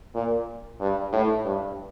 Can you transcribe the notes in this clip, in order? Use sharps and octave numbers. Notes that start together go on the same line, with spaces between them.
A#2
G2
A2
G2